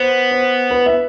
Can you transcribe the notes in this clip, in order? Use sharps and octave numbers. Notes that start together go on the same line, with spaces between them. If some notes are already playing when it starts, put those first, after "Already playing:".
Already playing: B3 C5
C5
B4
E5